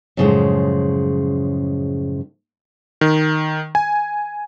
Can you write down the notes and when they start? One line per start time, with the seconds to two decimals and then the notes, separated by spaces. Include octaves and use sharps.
0.17 F#2 A2 C#3 E3 F3 G#3
3.01 D#3
3.75 G#5